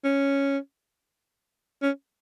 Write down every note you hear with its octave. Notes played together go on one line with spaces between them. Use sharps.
C#4
C#4